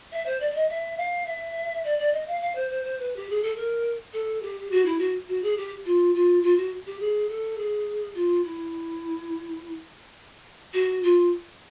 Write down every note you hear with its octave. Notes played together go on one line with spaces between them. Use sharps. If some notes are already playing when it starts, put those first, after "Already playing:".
E5
C5
D5
D5
D#5
E5
F5
E5
D5
D5
D#5
F5
F5
C5
C5
C5
B4
G4
G#4
A4
A#4
A4
G4
F#4
E4
F#4
F#4
G#4
G4
F4
F4
F4
F#4
G4
G#4
A4
G#4
F4
E4
F#4
F4